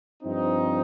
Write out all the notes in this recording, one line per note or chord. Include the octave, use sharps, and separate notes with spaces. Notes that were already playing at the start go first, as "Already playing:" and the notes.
G2 F3 C4 D#4